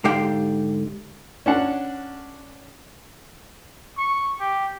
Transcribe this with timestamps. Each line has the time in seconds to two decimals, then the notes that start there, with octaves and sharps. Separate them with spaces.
0.05 G#2 D3 G4 F5 G5
1.46 C#4 D4 F#5
3.98 C#6
4.40 G4